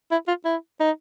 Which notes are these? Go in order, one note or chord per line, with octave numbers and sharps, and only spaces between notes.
E4
F4
E4
D#4